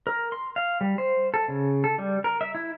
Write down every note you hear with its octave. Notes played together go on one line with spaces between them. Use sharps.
A#4
C6
F5
G3
C5
A4
C#3
A4
G3
A#4
E5
E4